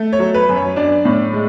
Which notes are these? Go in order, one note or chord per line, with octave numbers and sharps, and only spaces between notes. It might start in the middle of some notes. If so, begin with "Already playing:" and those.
Already playing: A3
C#5
F#3
B4
F#2
C#5
D4 D5
A2
G#3